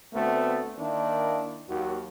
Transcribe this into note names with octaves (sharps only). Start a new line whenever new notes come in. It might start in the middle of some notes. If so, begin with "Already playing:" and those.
D2 A3 B3 C4
D#3 A#3 D4 E4
D#2 F#3